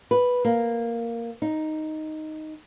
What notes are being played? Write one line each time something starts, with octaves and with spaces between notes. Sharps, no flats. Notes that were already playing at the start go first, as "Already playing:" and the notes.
B4
A#3
D#4